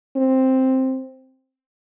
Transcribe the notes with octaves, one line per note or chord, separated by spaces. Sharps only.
C4